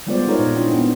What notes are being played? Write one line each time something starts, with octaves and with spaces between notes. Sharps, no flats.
G3 G#3 B3 F4 C5 D5
D#4 F4 G#4 A#4 C#5
A#2
C4 D4 E4
B3